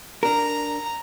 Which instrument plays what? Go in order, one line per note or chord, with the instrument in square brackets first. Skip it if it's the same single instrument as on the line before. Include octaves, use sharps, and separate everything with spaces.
[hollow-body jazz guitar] D4 A#4 [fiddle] A#5